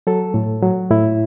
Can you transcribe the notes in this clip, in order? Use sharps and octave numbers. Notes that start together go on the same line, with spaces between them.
F#3 A4
A2
F#3
A2 E4